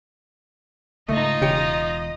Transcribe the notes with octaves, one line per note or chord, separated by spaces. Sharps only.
C#2 G#2 A3 D#4 F4 D#5
E1 C#3 G4 C#7